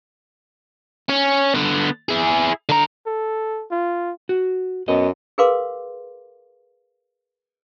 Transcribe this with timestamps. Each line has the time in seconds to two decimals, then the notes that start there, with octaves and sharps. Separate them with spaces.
1.09 C#4
1.55 D3 B3
2.09 E4 G#4
2.69 D3 A#5
3.06 A4
3.71 F4
4.29 F#4
4.88 F#2 B3 D#5
5.38 G#4 A#4 B4 F5 C6 D6